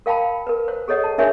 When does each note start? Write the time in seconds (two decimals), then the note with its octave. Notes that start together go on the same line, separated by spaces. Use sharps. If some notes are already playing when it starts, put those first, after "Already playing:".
0.06 A#4 F5 G5 A5 B5
0.47 A#4 B4
0.68 C5
0.88 G#4 A4 C#5 D#5 F#5
1.04 A5
1.18 D4 G#4 A#4 C#5 E5 G#5